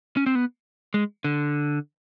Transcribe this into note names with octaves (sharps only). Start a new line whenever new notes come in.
C#4
C4
B3
G#3
D3